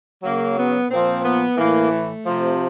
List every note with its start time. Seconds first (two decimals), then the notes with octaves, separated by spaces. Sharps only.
0.23 C#3 F#3 A#3
0.56 B3
0.90 A#2 F3 C4
1.24 B3
1.57 A2 E3 A#3
1.91 A3
2.25 C3 F3